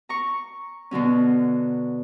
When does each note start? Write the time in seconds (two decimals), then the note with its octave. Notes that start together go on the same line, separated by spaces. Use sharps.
0.09 A#5 C#6
0.91 B2 D3 F#3 C#4